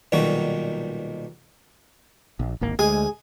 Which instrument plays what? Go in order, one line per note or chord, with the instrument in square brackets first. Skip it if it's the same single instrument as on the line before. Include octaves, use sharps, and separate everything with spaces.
[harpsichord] B1 A#2 D#3 G3 F#4
[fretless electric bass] A#1
D1 G#1 A#3
[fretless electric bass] D2 [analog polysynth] G#3 G#5 [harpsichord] G#4